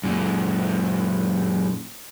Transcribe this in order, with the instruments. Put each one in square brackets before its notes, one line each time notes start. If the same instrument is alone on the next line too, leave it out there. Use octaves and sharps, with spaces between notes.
[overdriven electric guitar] F#2 A#2